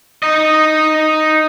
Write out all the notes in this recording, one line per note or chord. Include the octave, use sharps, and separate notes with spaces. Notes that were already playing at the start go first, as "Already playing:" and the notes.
D#4 D#5